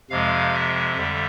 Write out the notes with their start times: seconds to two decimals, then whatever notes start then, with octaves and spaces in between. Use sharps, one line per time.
0.10 F2 C3 F3 G#3 F5
0.54 E5
0.97 F2 D3 G3